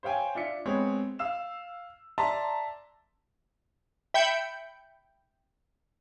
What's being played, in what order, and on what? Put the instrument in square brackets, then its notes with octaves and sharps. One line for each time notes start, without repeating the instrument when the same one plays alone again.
[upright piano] C5 C#5 F5 G5 G#5
D4 F4 E5 C#7
G#3 B3 C4 C#5
F5 E6 E7
D5 E5 A5 A#5 C6
[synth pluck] E5 G5 B5 G6 C#7